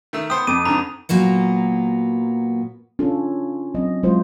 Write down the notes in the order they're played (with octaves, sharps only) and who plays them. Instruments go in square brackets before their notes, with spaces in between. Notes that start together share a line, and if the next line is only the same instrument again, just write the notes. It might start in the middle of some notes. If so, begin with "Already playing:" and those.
[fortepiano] D#3 A3 E6
[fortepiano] B3 C5 G5 [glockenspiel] D#6
[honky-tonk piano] F2 [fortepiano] D6 [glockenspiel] D#7
[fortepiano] G#2 D3 [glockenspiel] A#5
[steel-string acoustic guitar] A#2 F#3 A#3 B3
[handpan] C#4 D4 F4 A4
F#3 C4 D#5
F#3 G#3 E4 F4 C5